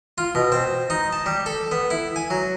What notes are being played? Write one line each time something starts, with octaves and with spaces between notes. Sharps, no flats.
F4
B2
C4
D#4
A5
G3
A4
B3
E4
G#5
F#3